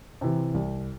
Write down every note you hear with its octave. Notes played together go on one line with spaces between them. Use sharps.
C3 E3
C2